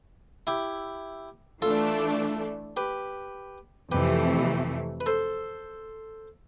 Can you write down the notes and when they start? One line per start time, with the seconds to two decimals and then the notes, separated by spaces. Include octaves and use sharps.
0.47 E4 G4
1.61 E3 A3 D4 F4 A4
2.77 G4 B4
3.92 F2 C3 E3 A3 G4 B4
5.01 B4
5.06 A4 C5